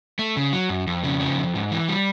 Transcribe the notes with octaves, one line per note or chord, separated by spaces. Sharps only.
A3
C#3
F#3
F#2
F2
C#3
F3
F2
G#2
E3
G3